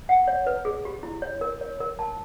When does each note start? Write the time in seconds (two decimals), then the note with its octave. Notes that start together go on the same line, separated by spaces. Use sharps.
0.09 F#5
0.28 C#5
0.47 B4
0.65 G#4
0.85 G4
1.03 E4
1.22 C#5
1.41 A#4
1.61 C#5
1.80 A#4
1.99 A5